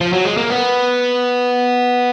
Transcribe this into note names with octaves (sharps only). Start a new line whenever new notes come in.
F3
F#3
G#3
A#3
B3